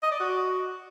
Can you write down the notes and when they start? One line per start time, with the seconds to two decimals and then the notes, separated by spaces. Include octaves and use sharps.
0.03 D#5
0.11 D5
0.20 F#4